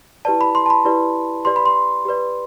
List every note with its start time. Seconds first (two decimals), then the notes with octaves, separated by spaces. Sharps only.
0.25 E4 G4 B4 D5 A5
0.41 B5
0.55 C6
0.66 A5
0.70 B5
0.85 E4 G4 B4 D5
1.45 G4 B4 D5 C6
1.56 B5
1.66 C6
2.05 G4 B4 D5